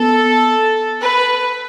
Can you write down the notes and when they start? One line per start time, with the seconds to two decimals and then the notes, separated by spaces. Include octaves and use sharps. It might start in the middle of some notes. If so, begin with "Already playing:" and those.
Already playing: B3 A4
1.01 B4